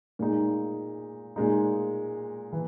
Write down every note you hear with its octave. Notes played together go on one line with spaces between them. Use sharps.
A#2 G#3 D#4
A#2 G#3 D#4
E3